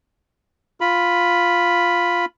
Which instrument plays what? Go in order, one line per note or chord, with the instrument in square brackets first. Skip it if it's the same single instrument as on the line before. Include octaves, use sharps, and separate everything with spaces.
[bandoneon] F4 B5